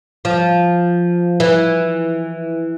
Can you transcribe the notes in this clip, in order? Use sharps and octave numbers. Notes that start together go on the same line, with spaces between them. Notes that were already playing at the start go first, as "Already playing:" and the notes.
F3
E3